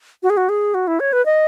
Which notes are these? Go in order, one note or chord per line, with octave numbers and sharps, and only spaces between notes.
F#4
G#4
F#4
G#4
F#4
E4
C#5
B4
D#5